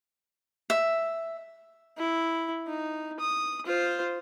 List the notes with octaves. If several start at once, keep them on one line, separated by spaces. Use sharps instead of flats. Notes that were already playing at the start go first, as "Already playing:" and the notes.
E5
E4
D#4
D#6
F4 C5